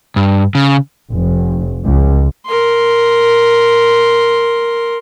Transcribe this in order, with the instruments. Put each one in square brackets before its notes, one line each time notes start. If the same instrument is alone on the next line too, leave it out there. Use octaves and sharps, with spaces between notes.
[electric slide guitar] G2
C#3
[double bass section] F1
C#2
[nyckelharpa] A#4 C6